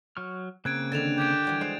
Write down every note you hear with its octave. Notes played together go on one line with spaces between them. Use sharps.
F#3 C#6 F6
C#3 A#3 C4 F#6 G#6 D7
D3 D#3 G3 A6 E7 F7
G4 G6 G#6 D7
E3 G3 F#4
G#3 C5 D5